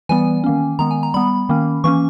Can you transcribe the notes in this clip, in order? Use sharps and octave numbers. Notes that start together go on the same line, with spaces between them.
E3 G3 B3 G#5
D#3 A#3 C#4
D#3 G#3 B3 A#5
G#5
A#5
G3 B3 B5
D#3 A#3 C#4
E3 A#3 C#4 C#6